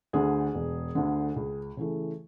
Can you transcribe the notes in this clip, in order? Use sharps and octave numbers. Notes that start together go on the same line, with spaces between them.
D2 D3 G#4
E1
D2 D3
C#2
C#3 E3 A3